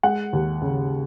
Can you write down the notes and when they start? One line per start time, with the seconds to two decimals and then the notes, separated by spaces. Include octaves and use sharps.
0.03 G#3 F#5
0.33 D#2
0.62 C#3